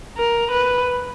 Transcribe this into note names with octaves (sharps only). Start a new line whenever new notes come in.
A#4
B4